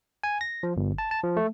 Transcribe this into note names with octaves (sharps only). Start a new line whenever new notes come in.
G#5
A#6
F3
G1
A5
A5
F3
A3